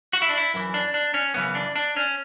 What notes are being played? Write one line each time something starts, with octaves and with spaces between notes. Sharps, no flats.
F#4
E4
D4
E4
F#2 E3
D4
D4
C#4
F#2 C#3 E3 B3
D4
D4
C#4